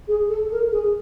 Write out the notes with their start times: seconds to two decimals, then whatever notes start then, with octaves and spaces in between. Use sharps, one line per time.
0.08 G#4
0.29 A4
0.50 A#4
0.71 G#4